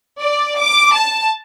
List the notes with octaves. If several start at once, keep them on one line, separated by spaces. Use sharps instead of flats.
D5
D6
A5